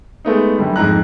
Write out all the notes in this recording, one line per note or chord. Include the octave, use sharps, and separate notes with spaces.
G#3 A3 B3 D#4
F#2 D3 G3
F2 G#2 A#5 F#6